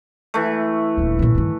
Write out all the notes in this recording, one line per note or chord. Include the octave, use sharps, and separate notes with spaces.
E3 A3
D#1 D2
A#2 C#3
G2 D#3